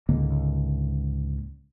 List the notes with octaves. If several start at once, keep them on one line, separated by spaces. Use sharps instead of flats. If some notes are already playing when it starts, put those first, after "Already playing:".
C#2 G#2 D3 A#3